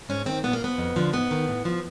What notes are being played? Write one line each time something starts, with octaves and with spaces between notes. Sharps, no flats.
G#2 C#4
D#3 C4
A#2 B3
A#3
F3 B3
F2
D3 F3
G#2 B3
D#3
A2
F3